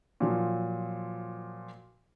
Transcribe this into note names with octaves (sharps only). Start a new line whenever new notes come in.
A#2 F3 F#3